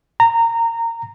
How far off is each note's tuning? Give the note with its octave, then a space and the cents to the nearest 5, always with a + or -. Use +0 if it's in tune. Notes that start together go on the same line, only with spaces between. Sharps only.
A#5 -20